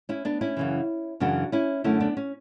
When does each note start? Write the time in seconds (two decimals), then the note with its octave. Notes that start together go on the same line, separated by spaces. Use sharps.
0.09 C#4 E4
0.25 B3 D4
0.41 C#4 E4
0.57 F#2 C#3 E3
1.20 F#2 C#3 E3 D4 F#4
1.52 C#4 E4
1.84 F#2 D3 A3 C#4 E4
2.00 B3 D4
2.17 C#4